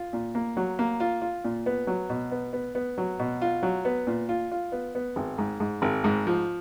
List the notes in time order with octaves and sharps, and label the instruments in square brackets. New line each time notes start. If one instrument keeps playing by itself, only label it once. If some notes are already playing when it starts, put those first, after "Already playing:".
Already playing: [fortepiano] F4
A#2
A#3
F#3
A#3
F4
F4
A#2
B3
F#3
B2
B3
B3
B3
F#3
B2
F4
F#3
B3
A#2
F4
F4
B3
B3
G#1
G#2
G#2
G#1
G#2
F3